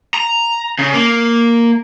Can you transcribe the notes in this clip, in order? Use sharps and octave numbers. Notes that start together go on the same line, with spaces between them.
A#5
C#3
A#3